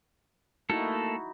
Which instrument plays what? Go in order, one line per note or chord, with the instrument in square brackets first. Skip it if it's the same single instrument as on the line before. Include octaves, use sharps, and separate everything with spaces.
[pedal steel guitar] A3 A#3 A4 [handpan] D#4 E4 F#4